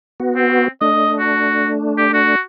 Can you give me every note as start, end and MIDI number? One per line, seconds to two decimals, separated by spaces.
0.20 0.68 59
0.20 0.68 66
0.36 0.67 60
0.81 2.35 57
0.81 2.35 62
0.81 1.13 75
1.19 1.69 66
1.98 2.09 67
2.13 2.40 66